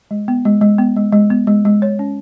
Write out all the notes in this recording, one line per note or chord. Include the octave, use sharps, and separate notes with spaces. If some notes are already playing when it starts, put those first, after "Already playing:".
G#3
B3
G#3
G#3
B3
G#3
G#3
B3
G#3
G#3
C#5
C#4